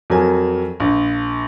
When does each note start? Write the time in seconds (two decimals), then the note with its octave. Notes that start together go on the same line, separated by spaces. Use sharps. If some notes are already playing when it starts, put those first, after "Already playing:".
0.10 F2 F#3 A#4 G#5
0.80 A#1